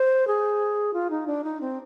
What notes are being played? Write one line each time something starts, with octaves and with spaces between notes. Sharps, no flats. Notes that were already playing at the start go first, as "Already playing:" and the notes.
Already playing: C5
G#4
F4
D#4
D4
D#4
C4